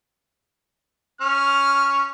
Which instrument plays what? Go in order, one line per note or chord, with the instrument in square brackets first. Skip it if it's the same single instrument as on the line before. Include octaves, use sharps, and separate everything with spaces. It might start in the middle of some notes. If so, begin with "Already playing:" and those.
[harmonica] C#4 [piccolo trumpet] F6